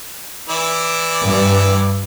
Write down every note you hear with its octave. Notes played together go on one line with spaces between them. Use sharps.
E3 E4 D5
G2